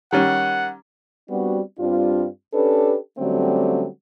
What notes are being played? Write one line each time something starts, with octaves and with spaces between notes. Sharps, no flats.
D#3 G3 C#4 F#5
G3 B3 C4 D4 F#4
G2 G3 C4 D4 F4
C#4 D4 G4 A4 B4
D3 F#3 G3 A3 C4 C#4